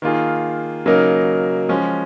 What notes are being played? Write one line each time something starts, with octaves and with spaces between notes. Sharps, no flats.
D#3 A#3 F4 G#4
C#3 F#3 A#3 D#4 A#4
F3 G#3 C#4